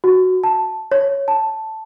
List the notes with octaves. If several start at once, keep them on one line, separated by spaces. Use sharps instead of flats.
F#4
A5
C#5
A5